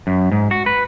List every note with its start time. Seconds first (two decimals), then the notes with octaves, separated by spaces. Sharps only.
0.07 F#2
0.32 G#2
0.51 F#4
0.66 B4